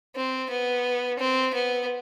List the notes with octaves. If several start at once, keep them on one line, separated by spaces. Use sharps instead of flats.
C4
B3
C4
B3